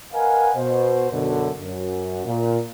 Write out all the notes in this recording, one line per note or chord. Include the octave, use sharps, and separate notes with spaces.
A#4 B4 D#5 F5 F#5 G#5
B2 C5
F#2 B2 D3
F#2
A#2